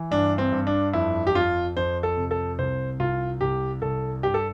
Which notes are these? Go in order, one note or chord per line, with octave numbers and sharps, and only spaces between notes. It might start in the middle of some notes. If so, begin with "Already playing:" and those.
Already playing: E3
G2 D4
C4
G2
D4
F2 E4
G4
F2 F4
F2 C5
A4
C3
A4
C2 C5
C2 F4
C2 G4
C2 A4
G2 G4
A4